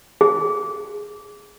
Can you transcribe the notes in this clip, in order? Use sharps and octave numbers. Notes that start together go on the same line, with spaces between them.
G#4